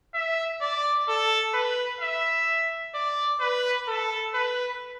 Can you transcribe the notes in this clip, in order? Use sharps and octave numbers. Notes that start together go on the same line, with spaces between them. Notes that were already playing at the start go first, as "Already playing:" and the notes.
E5
D5
A4
B4
E5
D5
B4
A4
B4